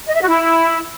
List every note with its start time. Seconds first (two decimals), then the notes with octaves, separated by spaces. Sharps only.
0.07 D#5
0.14 E5
0.21 F#4
0.28 E4